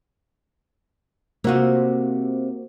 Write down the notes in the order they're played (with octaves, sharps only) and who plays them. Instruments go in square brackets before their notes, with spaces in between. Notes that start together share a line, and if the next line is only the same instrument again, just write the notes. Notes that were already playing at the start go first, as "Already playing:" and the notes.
[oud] C3 F4 [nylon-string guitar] A#3 F#4